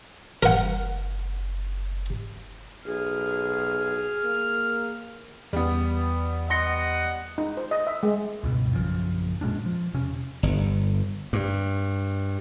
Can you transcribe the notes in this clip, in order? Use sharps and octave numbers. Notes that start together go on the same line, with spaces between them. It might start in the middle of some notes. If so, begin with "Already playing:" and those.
F#1 A#4 F#5
B1 G#4 F6
A#3
E2 G3 B3
D#5 F#5 C6 A#6 C#7
D#4
C5
D#5
E5
G#3
C#2 G2 B2
A#1 F#2 C#3 F3
A#2 G#3 C#4 D4
F3
E1 C3 C#4
G1
G2